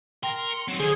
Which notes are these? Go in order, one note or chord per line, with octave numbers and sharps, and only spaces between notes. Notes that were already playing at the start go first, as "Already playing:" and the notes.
A#4 G5 C6 A#6
C#7
F#3 C4 D#4
D3 G#4 C5 G7